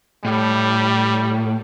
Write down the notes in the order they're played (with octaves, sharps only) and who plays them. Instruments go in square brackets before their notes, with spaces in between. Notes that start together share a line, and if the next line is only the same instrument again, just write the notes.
[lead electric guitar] A2 [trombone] G3